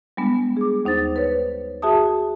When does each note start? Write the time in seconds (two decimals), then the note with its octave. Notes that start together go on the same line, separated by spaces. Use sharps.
0.17 G3 G#3 B3 D4
0.57 G#4 D6
0.85 D#2 D#4 C5 A6
1.16 B4 C#5
1.82 F#4 G#4 E5 A5 D#6